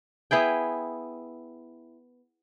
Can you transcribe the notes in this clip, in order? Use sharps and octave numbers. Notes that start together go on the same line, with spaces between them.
B3 E4 G#4 G5